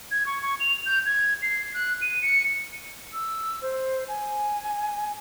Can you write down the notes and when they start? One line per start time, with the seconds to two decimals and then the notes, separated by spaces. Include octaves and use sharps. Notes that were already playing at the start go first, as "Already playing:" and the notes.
0.11 G#6
0.26 C#6
0.42 C#6
0.60 F7
0.86 G6
1.06 G#6
1.42 C7
1.74 F#6
2.02 D#7
2.22 C#7
3.13 E6
3.62 C5
4.08 G#5